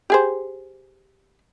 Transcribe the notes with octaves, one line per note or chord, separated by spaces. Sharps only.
G4 G#4 C5